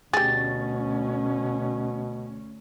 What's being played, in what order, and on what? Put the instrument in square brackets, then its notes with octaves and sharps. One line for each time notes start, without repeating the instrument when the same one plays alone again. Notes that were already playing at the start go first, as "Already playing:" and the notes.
[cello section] D2 C#4 [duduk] B2 [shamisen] G4 G#4 [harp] A6